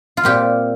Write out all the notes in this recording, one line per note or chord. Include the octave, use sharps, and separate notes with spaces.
F4
A#2 G3 C4 G4